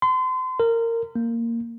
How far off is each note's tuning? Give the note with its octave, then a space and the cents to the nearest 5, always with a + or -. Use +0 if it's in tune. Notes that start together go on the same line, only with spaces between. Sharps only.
C6 -35
A#4 -20
A#3 -10